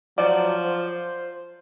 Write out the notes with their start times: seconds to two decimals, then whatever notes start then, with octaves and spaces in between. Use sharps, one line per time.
0.18 F3 F#3 D5
0.63 C5